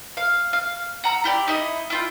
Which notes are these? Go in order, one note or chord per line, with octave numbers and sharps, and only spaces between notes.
F5
F5
F#5 A#5 E6
E4 G4 D5
D#4 E4 D#5
E4 F4 G5